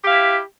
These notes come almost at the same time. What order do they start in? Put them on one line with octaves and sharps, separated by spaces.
G4 F5 E4